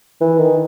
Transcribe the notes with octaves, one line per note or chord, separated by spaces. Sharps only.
E3
D#3